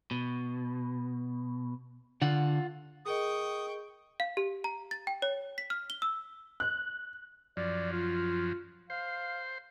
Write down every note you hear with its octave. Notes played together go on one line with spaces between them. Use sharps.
B2
D3 F4 F#5
G#4 A#4 D#5 G5 C#6 D#6
F5
G4
A#5
A6
G5
C#5
B6
F6
G7
E6
F#6
F#2 F3 D5
F4
C5 F5